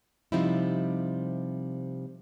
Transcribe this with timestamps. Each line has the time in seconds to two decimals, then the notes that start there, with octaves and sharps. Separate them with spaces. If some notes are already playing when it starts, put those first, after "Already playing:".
0.32 C3 F3 G3 C4 D#4 E4